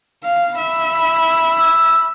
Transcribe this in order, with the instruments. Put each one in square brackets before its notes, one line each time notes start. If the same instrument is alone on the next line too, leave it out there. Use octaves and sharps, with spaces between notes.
[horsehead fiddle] F5
E5 B5
[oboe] E6